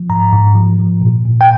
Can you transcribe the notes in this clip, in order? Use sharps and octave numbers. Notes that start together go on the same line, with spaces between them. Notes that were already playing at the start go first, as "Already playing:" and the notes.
Already playing: F3
G#2 A#5
G#2
F3
F3
A#2
A#2
G5